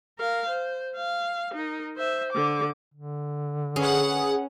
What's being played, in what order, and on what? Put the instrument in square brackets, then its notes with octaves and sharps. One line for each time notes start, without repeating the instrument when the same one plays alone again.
[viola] A#4 F5
C5
F5
D#4 A#4
C5 E5
D3 D6
[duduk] D3
[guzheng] C#4 [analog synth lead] G#4 [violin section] B4 F#5